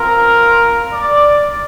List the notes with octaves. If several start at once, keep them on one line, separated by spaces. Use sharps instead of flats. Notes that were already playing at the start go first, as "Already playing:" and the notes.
Already playing: C4 F4 A#4
D5